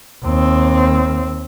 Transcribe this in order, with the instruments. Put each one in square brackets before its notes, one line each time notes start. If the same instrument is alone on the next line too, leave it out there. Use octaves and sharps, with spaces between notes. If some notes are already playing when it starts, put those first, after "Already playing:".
[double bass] D#2 C4